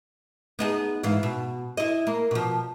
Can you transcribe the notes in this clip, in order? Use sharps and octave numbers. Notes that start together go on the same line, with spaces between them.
B3 D#4 G#4
G#2 E3 F4
B2
E4 D#5
A#3
B2 F3